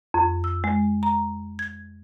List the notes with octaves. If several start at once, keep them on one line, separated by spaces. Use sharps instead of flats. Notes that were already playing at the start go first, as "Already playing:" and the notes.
F2
E6
G#3
A#5
G#6